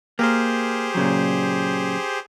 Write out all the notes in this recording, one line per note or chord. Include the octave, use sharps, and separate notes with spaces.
A#3 G4 G#4 C5
A#2 C#3 F#3